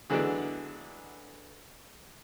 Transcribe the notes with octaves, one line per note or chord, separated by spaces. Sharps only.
D3 E3 F#3 G#3 B3 D4